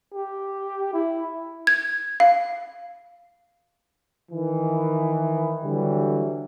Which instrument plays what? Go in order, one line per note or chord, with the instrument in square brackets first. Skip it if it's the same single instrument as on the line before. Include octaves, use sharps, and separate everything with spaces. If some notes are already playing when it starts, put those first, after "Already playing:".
[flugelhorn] G4
E4
[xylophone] G#6
F5
[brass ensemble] D#3 E3
D3 E3 F#3 G3